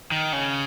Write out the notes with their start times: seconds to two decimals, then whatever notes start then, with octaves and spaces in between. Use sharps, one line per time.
0.11 D#3
0.33 C#3